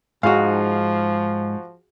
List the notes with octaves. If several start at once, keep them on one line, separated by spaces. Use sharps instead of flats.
G#2 F3 D#4 F#4 G#4 F5